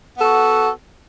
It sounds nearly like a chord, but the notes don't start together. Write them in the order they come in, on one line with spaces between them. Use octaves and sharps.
B3 A4 F#4